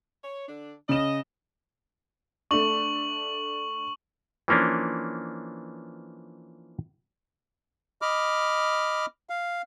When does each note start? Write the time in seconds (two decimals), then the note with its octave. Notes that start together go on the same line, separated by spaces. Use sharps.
0.24 C#5
0.47 D3 D4
0.89 C#3 D#5 E7
2.51 A3 D4 C#6 F#7
4.48 E3 F3 A#3 C#4 D4
8.02 D#5 B5 D6 F6
9.30 F5